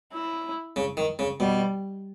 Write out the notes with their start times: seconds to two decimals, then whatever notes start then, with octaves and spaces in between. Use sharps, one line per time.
0.14 E4
0.76 C#3
0.97 D#3
1.19 C#3
1.40 B2 G3